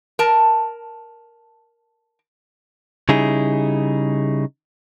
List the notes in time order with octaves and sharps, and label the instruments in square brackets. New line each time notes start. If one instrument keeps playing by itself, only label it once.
[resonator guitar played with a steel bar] A#4 A5
[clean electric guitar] C#3 G3 D#4 E4 G#4